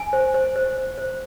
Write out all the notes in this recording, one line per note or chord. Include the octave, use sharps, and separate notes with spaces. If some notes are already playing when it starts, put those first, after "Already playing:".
Already playing: G#5
C5
C5
C5
C5
C5